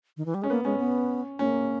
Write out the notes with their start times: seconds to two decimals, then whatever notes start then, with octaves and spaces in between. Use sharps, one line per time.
0.17 D#3
0.26 E3
0.34 G3
0.42 G#3 C#4
0.50 A#3 B3
0.65 G#3 C#4
0.80 B3
1.39 A#3 C#4